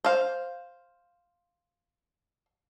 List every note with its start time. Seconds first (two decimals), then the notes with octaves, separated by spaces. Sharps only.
0.05 C5 F5